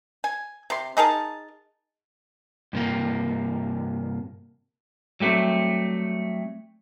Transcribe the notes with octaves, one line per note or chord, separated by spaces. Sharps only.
G#5
C3 C6
D#4 G#4 A#4 A5
G2 C3 A#3
F#3 G3 A3 A#3 C4